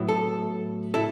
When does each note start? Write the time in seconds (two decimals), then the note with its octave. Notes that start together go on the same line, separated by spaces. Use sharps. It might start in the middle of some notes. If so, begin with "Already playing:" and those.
Already playing: A2 F#3 B3 E4
0.08 A4
0.94 E4 A4